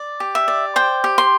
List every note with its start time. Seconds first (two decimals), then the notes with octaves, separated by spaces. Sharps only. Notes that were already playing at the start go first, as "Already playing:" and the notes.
Already playing: D5
0.20 G4
0.35 E5
0.48 D5
0.76 C5 G5
1.04 G4
1.18 C6